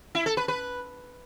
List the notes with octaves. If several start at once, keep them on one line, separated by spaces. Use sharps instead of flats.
E4
A4
B4
B4